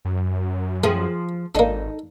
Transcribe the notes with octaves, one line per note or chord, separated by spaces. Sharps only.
F#2
F3 A3 G#4
G#1 A#3 D4 D#4 A4